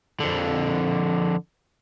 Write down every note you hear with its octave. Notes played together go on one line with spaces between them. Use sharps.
F2 D3